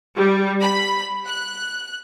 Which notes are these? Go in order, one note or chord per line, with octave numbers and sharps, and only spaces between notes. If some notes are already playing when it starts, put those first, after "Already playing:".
G3
B5
F#6